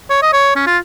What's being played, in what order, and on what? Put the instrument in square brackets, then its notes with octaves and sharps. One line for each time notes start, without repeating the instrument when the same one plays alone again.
[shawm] C#5
D#5
C#5
C#4
F4